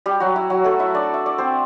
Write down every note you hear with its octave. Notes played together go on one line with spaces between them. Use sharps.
G3 G4
F#3 F#4
E4
F#3 F#4
A3 A4
E4 E5
D4 D5
E5
D5
C4 C5